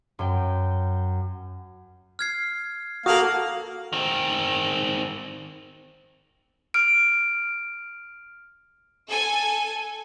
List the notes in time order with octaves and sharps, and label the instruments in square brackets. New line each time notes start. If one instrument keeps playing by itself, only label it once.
[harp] F#2 G5
[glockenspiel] F6 G#6 C7
[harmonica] A#3 F5 [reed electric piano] F#4 A4 [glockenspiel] D#6 F7 F#7
[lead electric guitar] D#3 C4
[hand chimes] F6 D7
[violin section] A4 G#5